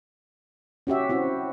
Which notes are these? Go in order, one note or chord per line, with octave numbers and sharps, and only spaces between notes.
C#4 F#4 G4 E5
C4 E4 F#4